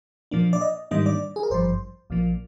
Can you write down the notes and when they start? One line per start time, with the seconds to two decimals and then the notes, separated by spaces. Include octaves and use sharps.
0.31 A#2 F3 A#3 D4
0.53 D5
0.61 D#5
0.91 G#2 D#3 G3 A#3 D4 D#5
1.06 D5
1.36 G#4
1.43 A#4
1.50 G#1 G2 F3 C5
2.10 A#1 A#2 F3 A#3